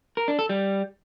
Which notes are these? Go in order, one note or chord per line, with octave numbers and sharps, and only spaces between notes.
A#4
D4
A4
G3